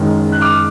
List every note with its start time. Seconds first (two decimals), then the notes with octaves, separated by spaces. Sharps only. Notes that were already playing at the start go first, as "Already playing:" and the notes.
Already playing: F#1 F#2 D#3 G#3
0.32 F#6
0.41 D6 F6